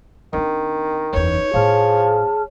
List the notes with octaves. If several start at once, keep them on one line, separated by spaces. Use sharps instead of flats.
D#3 C4 D4
F#1 E2 D#4 B4 C#5 G6
A2 F3 B3 G#4 A5 F6